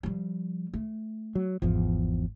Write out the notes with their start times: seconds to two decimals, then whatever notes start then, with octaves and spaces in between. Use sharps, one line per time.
0.03 F3 G3
0.74 A3
1.35 F#3
1.62 G#1 E2 F3